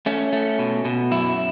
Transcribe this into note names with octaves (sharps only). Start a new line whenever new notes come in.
A3 C#4
A3
B2
B2
F#2 E4